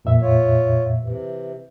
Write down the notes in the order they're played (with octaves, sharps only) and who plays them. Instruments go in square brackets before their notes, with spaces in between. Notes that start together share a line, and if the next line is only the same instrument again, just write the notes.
[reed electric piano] F2 A#2 E5
[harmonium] F4 C#5
C3 E3